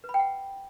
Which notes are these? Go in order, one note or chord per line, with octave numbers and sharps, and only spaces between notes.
B4
B5
G5
F#5